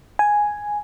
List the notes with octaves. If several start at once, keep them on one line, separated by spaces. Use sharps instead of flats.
G#5